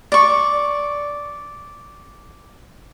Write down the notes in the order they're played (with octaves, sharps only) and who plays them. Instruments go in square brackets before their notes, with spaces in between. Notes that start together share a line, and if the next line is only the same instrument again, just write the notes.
[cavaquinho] D5 C#6